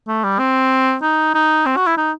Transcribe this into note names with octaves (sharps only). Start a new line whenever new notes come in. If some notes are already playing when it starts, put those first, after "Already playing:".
A3
G3
C4
D#4
D#4
C4
F#4
E4
D#4